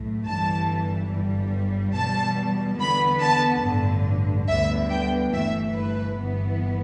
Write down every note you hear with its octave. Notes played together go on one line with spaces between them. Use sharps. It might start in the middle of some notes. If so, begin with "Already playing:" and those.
Already playing: B1 A2 A3
G1 G2 E3 G3 A5
G1 G2 G3
E2 B2 G3 A5
E2 D3 B3 B5
A5
A1 G2 D3
D2 D3 G3 B3 E5
G5
G1 G2 E3 A3 E5
B4
G1 G2 E3 B3